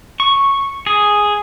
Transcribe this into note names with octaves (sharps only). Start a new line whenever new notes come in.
C#6
G#4